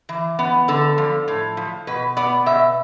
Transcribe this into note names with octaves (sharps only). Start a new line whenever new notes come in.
E3
B3
D3 A4
F3
A2
F3
B2 B4
B3 D5
B2 E5